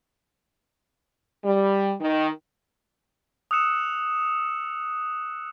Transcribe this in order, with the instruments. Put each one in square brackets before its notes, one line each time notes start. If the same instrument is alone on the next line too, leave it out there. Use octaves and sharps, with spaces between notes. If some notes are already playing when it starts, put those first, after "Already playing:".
[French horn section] G3
D#3
[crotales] D#6 E6 F#6 C#7 E7